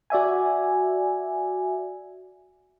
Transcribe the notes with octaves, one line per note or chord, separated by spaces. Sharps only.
F#4 D5 E5 G#5